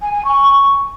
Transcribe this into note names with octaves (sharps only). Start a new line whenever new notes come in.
G#5
G#5
C#6